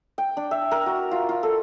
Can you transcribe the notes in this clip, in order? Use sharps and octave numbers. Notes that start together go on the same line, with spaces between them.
G5
D4
E5
A#4
F#4
F4
F4
A4